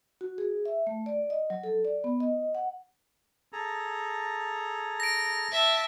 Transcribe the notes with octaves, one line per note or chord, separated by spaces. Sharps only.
F#4
G#4
E5
A3
D5
D#5
F#3
A4
D5
B3
D#5
F#5
G#4 A4 A#5
A#6 D7
E5 A5